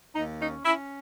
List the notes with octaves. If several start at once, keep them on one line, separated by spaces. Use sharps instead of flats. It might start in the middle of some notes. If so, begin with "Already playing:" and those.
D#2 D#4
C#4 D#4
C#4 E4